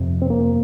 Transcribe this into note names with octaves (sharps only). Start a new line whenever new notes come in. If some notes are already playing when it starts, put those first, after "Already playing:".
Already playing: F2 C3
C4
A#3